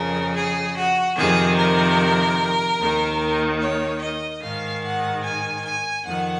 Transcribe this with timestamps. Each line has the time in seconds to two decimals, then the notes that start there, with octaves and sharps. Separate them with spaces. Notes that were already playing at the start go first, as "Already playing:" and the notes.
Already playing: F2 C#3 A#4
0.34 G#4
0.75 F#4
1.16 F2 C3 D#3 G#4
1.56 A#4
2.79 D#2 D#3
3.60 C#5
4.00 D#5
4.42 G#2 D#3 F5
4.83 F#5
5.22 G#5
5.63 G#5
6.04 F2 D#3 F#5